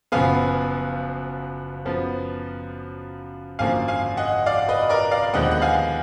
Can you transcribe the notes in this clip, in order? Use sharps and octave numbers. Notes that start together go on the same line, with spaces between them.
F#1 F#2 F3 B3 F5 G#5
F#2 F3 B3
G#1 F#2 D3 F3 A#3 F5 G#5
F5 G#5
D#5 F#5
D5 F5
B4 D#5
A#4 D5
D5 F5
D#2 D3 F3 G#3 B3 D#5 F#5
F#5
F5 G#5